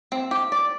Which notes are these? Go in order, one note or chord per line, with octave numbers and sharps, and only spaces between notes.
C4
G4
D5